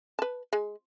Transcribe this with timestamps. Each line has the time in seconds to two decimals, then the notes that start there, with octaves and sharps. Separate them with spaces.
0.19 B4 A5
0.53 G#3